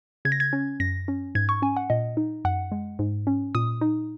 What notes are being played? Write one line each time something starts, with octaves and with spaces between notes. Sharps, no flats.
C#3 G#6
A#6
G#6
C#4
F#2 A#6
C#4
G#2 G#6
C#6
C#4 G#5
F#5
A#2 D#5
D#4
F#2 F#5
G#3
G#2
C#4
A#2 D#6
D#4